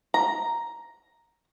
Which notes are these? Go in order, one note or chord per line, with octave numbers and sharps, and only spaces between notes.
A#5